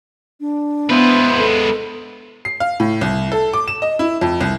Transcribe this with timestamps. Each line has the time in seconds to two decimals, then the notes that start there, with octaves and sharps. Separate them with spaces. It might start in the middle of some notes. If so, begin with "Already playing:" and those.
0.41 D4
0.90 G#3 B3 E4 B4 C5
1.38 A4
2.45 C7
2.60 F5
2.80 A2
3.01 C2
3.32 A4
3.53 D6
3.68 E7
3.82 D#5
3.99 E4
4.21 F2
4.41 C2